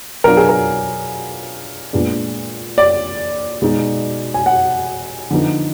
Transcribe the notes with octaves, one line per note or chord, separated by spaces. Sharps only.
B2 F#3 B3 D4 F4 A#4
G#4
A#4
A#2 G#3 B3 D4
D5
B2 G#3 D#4
G#5
F#5
D3 F3 B3 D#4